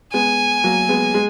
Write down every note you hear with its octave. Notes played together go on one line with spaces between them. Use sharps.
G#3 B3 G#5
F#3 A#3
G#3 B3
G#3